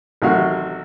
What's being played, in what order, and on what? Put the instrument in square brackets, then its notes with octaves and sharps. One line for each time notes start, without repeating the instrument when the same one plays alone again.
[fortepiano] A1 C3 D#3 F#3 F#4 F5